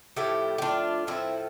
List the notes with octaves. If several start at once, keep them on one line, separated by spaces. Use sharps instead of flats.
A2 F3 A3 E4 G4
G4
D4 F4
A2 F3 A3 C4 E4